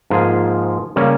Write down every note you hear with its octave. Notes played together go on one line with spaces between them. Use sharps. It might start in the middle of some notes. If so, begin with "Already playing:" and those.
G#2 F3 A#3 F4 G#4
C#3 G3 A#3 C#4